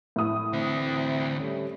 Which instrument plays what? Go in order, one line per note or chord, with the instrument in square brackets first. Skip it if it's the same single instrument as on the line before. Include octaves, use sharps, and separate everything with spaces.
[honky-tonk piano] A2 D#6
[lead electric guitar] D2 E5 [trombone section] E3 C4
[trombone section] G3 A3 C#4